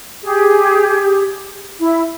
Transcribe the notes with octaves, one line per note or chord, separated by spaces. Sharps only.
G4 G#4
E4